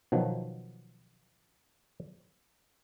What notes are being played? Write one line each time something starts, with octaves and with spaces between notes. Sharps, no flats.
B2 D#3 F3 F#3